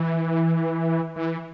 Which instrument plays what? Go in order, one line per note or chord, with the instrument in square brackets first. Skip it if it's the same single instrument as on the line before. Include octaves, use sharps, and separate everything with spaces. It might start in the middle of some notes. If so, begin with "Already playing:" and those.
Already playing: [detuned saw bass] E3
E3